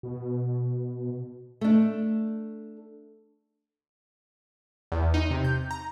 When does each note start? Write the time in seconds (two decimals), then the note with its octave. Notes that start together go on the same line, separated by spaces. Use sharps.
0.03 B2
1.61 A3 D4
4.92 E2
5.14 D#4
5.31 C3
5.44 G6
5.71 A#5